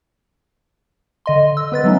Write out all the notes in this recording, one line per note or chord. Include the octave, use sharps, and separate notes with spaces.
D3 D#5 C6
E6
B3 B4 A6
F#3 A3 B3 C#4 D#4